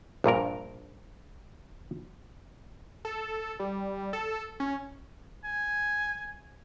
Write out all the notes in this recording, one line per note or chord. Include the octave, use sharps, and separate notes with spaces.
A#1 G2 A#2 A#4
A4
G3
A4
C#4
G#5